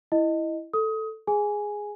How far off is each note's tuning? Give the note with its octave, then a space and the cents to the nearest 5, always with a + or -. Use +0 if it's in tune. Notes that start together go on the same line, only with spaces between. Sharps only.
E4 +0 D#5 +0
A4 +0 D#6 +20
G#4 +0 G#5 +0